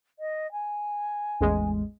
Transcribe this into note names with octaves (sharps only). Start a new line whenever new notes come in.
D#5
G#5
A1 E2 G#3